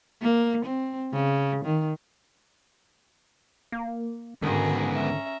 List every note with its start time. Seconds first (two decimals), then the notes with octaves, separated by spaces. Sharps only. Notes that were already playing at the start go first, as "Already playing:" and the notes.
0.22 A#3
0.65 C4
1.13 C#3
1.65 D#3
3.72 A#3
4.42 C#2 G#2 D3 D#3 B3 F#4 G#4 A#5
4.93 C#4 E5 A#5